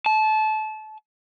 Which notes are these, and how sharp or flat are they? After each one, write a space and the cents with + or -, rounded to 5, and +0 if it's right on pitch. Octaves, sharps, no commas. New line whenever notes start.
A5 -25